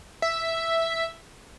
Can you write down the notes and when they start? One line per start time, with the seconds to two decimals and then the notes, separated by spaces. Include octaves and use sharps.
0.22 E5